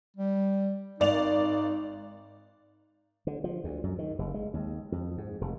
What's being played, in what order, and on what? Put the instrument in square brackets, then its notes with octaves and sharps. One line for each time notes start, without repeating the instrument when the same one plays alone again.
[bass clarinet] G3
[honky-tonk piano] G#1 D5 F7 [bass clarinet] D#4
[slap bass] D3
F3
D2
F#2
D#3
F#1
G#3
D#2
F2
G#2
F1